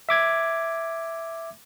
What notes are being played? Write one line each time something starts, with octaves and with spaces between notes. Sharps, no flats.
E5 D6 G#6